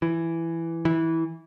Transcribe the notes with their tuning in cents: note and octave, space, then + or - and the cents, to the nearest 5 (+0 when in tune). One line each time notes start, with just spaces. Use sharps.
E3 +10
E3 -15